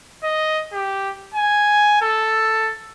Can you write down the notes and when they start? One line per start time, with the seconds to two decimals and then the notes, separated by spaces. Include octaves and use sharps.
0.23 D#5
0.73 G4
1.34 G#5
2.01 A4